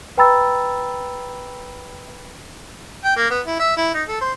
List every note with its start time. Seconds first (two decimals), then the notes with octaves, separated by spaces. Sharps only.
0.17 B4 G5 A#5 B5 E6 A6
3.04 G5
3.17 A#3
3.30 B3
3.47 E4
3.60 E5
3.77 E4
3.94 D#4
4.08 A4
4.21 C5